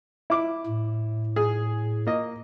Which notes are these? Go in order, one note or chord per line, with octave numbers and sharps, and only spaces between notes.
E4 D6
A2
G#4
A#3 D#5